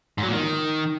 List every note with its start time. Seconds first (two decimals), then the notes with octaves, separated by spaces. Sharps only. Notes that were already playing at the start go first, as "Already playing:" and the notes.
0.18 G#2
0.23 F#3
0.28 A#2
0.33 D#3